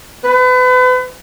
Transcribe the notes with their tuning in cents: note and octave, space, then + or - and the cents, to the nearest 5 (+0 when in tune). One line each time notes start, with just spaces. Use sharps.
B4 +35